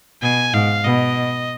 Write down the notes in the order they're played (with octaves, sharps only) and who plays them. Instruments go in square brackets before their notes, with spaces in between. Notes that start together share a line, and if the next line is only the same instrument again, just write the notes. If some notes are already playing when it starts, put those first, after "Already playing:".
[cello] B2 [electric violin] G#5
[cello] G#2 [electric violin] F5
[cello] B2 [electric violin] D#5